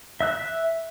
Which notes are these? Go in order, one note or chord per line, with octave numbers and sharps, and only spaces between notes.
E5 E6 F#6